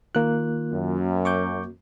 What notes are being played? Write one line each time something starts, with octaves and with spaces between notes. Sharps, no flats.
D#3 A#3 F4 F#6
F#2
C#6 D6 G6